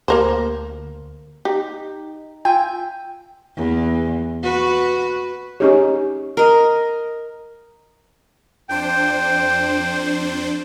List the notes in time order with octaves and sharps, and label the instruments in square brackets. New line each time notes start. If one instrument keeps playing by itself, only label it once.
[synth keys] D2 [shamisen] A#3 A#4 C5
[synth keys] D#4 [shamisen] G4
[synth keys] F4 E5 G#5 [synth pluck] G5
[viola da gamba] E2
F#4 B4
[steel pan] C#4 D#4 C#5 [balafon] G4 G#4
[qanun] A#4 D#5
[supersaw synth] F2 D4 C5 [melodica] G5